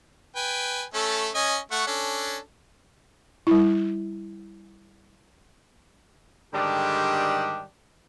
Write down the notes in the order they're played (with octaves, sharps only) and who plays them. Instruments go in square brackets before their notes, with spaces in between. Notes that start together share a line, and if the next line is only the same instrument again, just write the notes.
[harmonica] B4 G5 G#5
A3 C#4 A4
C#4 D#5 G#5
A3 F#5 C#6
C#4 D4 A4
[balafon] G3 E4
[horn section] G#2 D3 D#3 G3 D4 G4